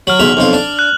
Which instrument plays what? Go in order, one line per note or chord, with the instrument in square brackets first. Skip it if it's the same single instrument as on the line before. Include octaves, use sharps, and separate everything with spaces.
[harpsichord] F#3 [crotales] F6 F#7
[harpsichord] B1 E2 E5 [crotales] F7
[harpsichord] B1 F2 F4
D4
[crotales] F#6